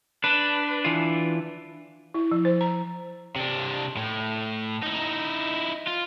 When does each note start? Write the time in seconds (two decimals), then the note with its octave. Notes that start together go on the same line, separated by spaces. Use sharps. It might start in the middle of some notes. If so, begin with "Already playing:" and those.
0.24 D4 B4
0.85 E3 F4
2.14 E4
2.31 F3
2.45 C5
2.61 A#5
3.36 C3 D4
3.97 A2
4.83 D#4 E4
5.87 F4